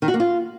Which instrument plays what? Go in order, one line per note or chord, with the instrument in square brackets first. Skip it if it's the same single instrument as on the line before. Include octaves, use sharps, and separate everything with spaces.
[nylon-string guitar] D#3
F#4
A#3
F4